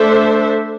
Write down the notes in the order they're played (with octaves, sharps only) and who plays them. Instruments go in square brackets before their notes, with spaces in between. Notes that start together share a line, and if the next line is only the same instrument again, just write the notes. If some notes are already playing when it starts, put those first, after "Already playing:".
Already playing: [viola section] A3 D4 A4 C5 E5